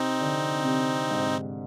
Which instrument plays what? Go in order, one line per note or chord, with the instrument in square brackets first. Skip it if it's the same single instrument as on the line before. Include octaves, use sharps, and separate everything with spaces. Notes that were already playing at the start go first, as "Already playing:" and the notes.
Already playing: [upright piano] C3 [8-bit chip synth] C4 D#4
[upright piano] D3
C3
G#2